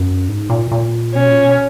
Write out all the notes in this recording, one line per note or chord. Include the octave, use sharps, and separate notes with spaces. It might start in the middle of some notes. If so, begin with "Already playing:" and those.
Already playing: F#2
G#2
A#2
A#2
B2 C#4
A#2
B2